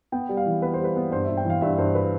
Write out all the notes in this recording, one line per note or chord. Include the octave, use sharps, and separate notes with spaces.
B3 G5
G3
F5
E3
B3 B4
C5
G3 B4
B3
G2 C5
G2 E5
G5
E3
F5
G2 E5
G2 C5
B4